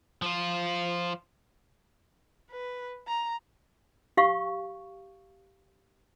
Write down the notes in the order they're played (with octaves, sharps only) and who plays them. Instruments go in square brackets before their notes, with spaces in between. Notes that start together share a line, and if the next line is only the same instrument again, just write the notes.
[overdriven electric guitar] F3 F4
[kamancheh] B4
A#5
[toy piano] G4 F5 C#6